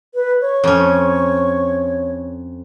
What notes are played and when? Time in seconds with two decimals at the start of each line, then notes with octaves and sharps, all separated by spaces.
0.15 B4
0.41 C#5
0.64 F2 C#4